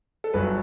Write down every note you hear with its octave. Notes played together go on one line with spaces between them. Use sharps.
A4
G1 G2 F#3 B4